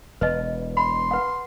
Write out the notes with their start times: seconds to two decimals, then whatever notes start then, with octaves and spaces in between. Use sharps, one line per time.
0.21 E1 B4 D#5
0.77 B5 C6
1.11 B4 F#5